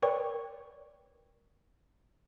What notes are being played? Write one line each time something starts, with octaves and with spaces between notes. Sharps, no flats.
A#4 B4 C#5 D5 G5 C#6